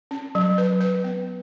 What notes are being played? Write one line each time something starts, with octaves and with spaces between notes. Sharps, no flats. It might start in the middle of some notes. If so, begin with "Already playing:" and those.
C#4
F#3
B4
B4
B3